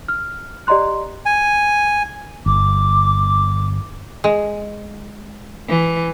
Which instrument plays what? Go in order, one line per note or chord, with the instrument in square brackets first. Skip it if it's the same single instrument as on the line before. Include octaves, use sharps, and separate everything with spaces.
[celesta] F6
G4 D5 D#5 A#5 C6 F#6
[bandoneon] G#5
[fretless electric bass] G1 [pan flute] D6
[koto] G#3
[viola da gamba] E3